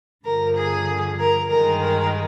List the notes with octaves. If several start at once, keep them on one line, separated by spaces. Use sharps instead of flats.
G2 D3 F3 A#4
G#4
A#4
G2 D#3 G#3 A#4
A#4